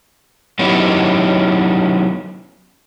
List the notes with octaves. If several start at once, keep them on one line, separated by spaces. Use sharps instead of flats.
F#3 B3 C#4 D#4 E4 G4